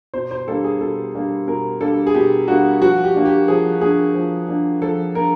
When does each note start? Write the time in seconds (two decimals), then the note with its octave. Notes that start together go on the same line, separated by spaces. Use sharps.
0.14 B2 C5
0.31 C5
0.47 G3 A#3 D4 A4
0.64 G#4
0.81 B2 A4
1.14 G3 A#3 D4
1.47 B2 A#4
1.81 G3 A#3 D4 A4
2.07 G#4
2.14 B2 G4
2.48 G3 A#3 D4 F#4
2.81 F3 F#4
3.04 G4
3.15 A#3 D4
3.26 G4
3.48 F3 G#4
3.81 A#3 D4 G#4
4.15 F3
4.48 A#3 D4
4.82 F3 A4
5.15 A#3 D4 A#4